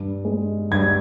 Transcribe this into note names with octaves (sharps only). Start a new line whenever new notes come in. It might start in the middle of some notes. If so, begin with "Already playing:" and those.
Already playing: G2
G#3
G2 G#6